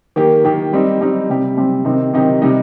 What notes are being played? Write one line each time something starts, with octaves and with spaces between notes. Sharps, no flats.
D#3 A#3 G4
D#3 A#3 G4
G3 C4 D#4
G3 C4 D#4
C3 G3 C4 G4
C3 G3 C4 G4
C3 D#3 C4 D#4 G4
C3 D#3 C4 D#4 G4
C3 G3 D#4